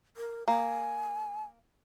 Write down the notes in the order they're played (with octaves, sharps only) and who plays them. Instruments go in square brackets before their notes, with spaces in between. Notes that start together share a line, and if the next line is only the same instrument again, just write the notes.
[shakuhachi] A#4
[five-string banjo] A#3 [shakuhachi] G#5